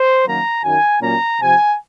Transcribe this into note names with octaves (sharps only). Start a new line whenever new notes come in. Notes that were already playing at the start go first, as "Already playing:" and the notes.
Already playing: C5
F#2 D#3 F#3 A#3 A#5
F#2 D#3 F#3 G#5
A#2 F#3 A#3 C#4 A#5
C3 F3 C4 G#5